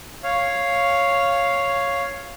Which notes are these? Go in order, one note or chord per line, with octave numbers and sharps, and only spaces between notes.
C#5 F5